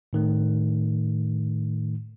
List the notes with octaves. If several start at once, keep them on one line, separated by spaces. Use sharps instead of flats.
A2 D#3 A3